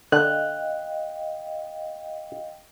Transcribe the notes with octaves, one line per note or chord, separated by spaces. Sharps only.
D3 D#5 F5 G5 F#6